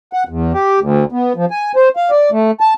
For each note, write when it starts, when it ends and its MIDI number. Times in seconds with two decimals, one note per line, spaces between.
0.13 0.24 78
0.29 0.52 40
0.53 0.80 67
0.80 1.04 38
1.12 1.33 59
1.36 1.45 53
1.51 1.72 80
1.76 1.89 72
1.96 2.10 77
2.11 2.30 74
2.32 2.51 57
2.60 2.74 81